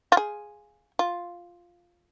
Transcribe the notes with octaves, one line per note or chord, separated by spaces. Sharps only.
F4
G#4
F4